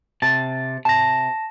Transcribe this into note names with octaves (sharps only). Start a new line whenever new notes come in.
C3 A5
C3 A5 A#6